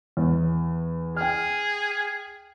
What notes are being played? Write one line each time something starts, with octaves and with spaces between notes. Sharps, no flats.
E2
G#4 G5 F6